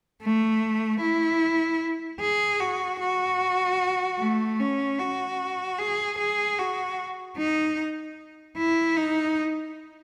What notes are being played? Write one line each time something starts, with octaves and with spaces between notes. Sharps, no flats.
A3
E4
G#4
F#4
F#4
A3
C#4
F#4
G#4
G#4
F#4
D#4
E4
D#4